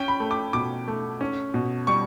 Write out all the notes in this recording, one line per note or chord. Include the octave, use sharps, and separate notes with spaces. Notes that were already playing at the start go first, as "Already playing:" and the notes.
Already playing: C#4 G5
B5
A3
D6
B2 D6
A3
C#4
B2
G3 C#6